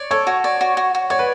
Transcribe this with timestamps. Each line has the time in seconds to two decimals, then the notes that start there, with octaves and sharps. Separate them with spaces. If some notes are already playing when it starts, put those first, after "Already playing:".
Already playing: C#5 D5
0.11 A4 C#5
0.27 F#4
0.44 D5
0.61 F#4
0.77 F#4
0.95 F#4
1.10 C#5 D5
1.19 B4